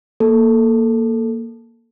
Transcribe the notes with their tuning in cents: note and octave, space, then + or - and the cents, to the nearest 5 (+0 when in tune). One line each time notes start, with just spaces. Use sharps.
A#3 -5 A4 +0